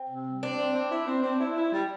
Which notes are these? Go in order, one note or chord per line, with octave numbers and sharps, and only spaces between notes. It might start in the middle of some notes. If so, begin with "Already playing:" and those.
Already playing: C4
C3
G3
C4 D4
C4
C4
E4
C4
C4
E4
E4
G3